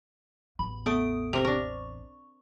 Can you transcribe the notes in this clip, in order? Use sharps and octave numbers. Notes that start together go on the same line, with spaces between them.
A1 E2 B5
A3 B3 D#6 D7
C3 A#4 F7
D4 A#4 C#6